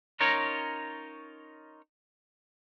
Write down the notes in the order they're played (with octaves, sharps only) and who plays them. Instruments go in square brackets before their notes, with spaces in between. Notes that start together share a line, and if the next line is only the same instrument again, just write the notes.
[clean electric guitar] C#4 D#4 F4 A#4 C#5